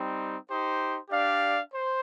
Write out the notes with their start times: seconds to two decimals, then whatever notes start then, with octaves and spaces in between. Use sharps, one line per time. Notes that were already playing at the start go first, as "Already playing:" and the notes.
Already playing: G3 C4 D#4
0.48 D#4 G4 C5
1.10 D4 G4 D5 F5
1.72 C5